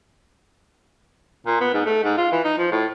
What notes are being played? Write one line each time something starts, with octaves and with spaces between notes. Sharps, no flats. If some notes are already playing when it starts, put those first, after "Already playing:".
A#2
B3
G#2
A3
G#2
F4
E3
D#4
F3
A2